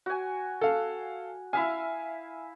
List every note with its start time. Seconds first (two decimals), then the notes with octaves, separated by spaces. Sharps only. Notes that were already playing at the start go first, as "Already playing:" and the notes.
0.06 F#4 G#5
0.61 A4 F5
1.53 E4 E5 F5 G#5